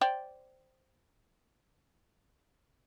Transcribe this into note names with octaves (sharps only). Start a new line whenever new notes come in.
C5 D5 G5